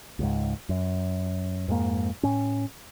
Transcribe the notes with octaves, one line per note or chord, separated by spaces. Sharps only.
C#2 G#2
F#2
F2 G#2 G#3 A#3
A2 C#4